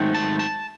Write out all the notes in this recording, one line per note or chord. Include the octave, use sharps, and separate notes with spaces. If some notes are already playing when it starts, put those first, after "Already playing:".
Already playing: G#2 D#3 F#3 A3 C4
A5
A5